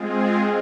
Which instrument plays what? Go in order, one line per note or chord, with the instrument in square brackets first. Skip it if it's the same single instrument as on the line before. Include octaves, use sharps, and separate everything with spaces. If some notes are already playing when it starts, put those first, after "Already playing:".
Already playing: [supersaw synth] G#3 C4 F4 G#4